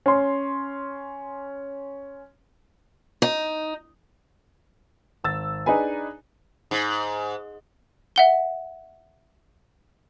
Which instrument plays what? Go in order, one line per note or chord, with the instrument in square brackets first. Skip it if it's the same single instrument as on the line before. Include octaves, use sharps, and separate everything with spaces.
[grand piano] C#4 C6
[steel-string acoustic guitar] D#4
[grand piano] G#1 E6 A6
D4 D#4 G#4 B4 G#5
[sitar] G#2
[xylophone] E5 F#5 G7